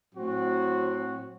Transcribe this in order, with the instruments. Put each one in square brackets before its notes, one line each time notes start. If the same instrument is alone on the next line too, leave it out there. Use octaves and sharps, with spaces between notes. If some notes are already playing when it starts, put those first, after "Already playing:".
[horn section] A2 F#3 C4 F#4